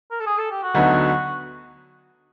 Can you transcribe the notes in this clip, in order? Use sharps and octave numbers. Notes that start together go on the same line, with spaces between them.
A#4
A4
G#4
A4
G4
F#4
D2 D3 F#3 B3 D#4